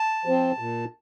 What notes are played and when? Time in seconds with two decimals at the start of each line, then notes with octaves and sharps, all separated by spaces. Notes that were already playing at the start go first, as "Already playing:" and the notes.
Already playing: A5
0.26 F3 C4
0.59 A#2